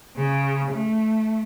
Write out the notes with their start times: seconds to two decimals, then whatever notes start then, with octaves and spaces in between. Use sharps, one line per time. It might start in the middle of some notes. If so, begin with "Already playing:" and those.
0.17 C#3
0.71 A3